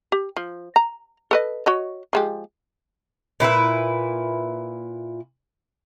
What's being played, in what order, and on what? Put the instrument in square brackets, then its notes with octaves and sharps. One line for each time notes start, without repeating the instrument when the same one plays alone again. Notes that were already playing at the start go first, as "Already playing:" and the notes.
[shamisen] G4
F3
A#5
A4 B4 D#5
F#4 C#5 D#5
F3 G#3 G4
[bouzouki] A#2 E4 B4 E5